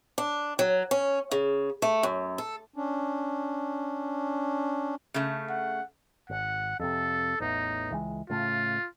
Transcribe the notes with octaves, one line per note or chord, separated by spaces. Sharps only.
D4
F#3
C#4
C#3
A3
F#2
A4
C#4 D4
C#3 A3
F#5
G#1 F#5
F2 C3 A4
A1 E2 D#4
C#2 E3 G#3
A2 C#3 A3 F4